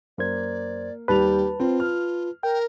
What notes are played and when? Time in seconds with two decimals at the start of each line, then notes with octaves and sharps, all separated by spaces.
0.18 F#2 A#3 C5 D5 G#6
1.08 D#2 G3 G4 B4 A5 F7
1.60 C4 F4
1.80 F6
2.43 A#4 G5